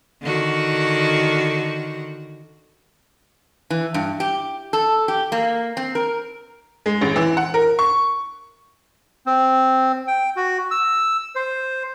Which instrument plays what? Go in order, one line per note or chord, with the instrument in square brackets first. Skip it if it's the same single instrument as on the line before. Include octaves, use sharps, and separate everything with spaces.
[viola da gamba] D3 D#3 F#4
[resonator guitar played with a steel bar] E3
G2
G4
A4
G4
A#3
C4
A#4
[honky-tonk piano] G#3
A1
E3
F#5
A#4
C#6
[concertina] C4
G5
F#4
E6
C5